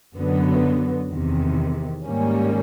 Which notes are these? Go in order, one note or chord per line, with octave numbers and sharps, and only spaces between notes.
F#2 D3 F#3 B3
E2 C3 D#3
G#2 D#3 G3 A#3 C#4